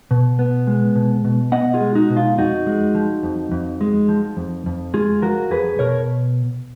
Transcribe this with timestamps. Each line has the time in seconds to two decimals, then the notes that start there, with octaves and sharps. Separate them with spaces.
0.11 B2
0.39 B3
0.67 G#3
0.96 B2
1.25 B2
1.52 B3 D#5 F#5
1.74 F4 G#4
1.81 G#3
1.95 D#4 F#4
2.10 B2
2.17 F4
2.38 F2 D#4 F#4
2.67 G#3
2.95 F3
3.23 F2
3.52 F2
3.81 G#3
4.09 F3
4.37 F2
4.66 F2
4.94 G#3 F4 G#4
5.22 F3 F#4 A#4
5.51 F2 G#4 B4
5.79 B2 A#4 C#5